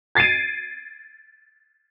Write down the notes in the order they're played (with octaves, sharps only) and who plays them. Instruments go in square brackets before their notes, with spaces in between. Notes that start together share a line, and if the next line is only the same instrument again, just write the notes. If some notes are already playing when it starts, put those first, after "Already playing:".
[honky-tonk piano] G#6 A6 C7 D7 D#7